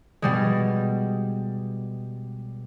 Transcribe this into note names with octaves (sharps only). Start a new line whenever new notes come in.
B2 G3 G#3